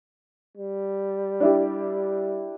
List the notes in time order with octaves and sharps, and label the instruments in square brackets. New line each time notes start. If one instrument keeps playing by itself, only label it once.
[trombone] G3
[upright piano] D4 E4 G4